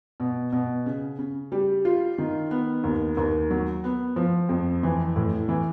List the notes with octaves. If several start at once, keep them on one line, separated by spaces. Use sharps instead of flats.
B2
B2
C#3
C#3
G3
F4
D#3
B3
D#2
D#2
F#3
B3
F3
F2
E3
A2
E3